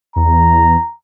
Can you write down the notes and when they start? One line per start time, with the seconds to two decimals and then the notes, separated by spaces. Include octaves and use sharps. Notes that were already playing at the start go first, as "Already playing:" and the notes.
0.16 E2 A#5